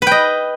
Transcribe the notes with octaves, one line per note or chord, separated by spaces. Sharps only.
B4 D#5 G5